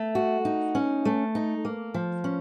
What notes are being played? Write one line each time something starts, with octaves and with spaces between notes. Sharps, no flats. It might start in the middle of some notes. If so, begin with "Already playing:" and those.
Already playing: A3
F#4
D#4
C#4
A3
D#4
A#3
F3
C#4